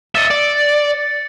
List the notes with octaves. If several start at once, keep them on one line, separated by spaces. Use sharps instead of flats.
D#5 E5 A6 C#7
D5